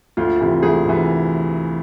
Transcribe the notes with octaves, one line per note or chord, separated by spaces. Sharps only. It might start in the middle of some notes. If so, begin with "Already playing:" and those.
D2 F4
C3 E3
D2 G#4
C3 E3